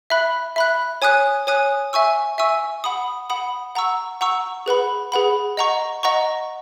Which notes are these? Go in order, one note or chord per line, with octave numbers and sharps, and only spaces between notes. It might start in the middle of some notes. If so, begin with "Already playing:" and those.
E5 B5 F#6
E5 B5 F#6
C#5 G#5 D#6 F#6
C#5 G#5 D#6 F#6
E5 G#5 C#6 E6
E5 G#5 C#6 E6
F#5 B5 D#6
F#5 B5 D#6
F#5 A#5 C#6 E6
F#5 A#5 C#6 E6
G#4 B4 F#5 B5
G#4 B4 F#5 B5
D#5 F#5 A#5 C#6
D#5 F#5 A#5 C#6